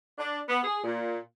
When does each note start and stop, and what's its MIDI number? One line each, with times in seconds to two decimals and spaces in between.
0.18 0.39 62
0.48 0.60 59
0.64 0.82 68
0.84 1.19 46